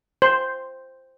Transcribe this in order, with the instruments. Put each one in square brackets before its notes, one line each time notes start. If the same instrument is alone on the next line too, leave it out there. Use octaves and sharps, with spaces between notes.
[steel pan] C5